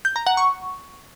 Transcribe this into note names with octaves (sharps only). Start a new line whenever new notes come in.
G6
A#5
F#5
C#6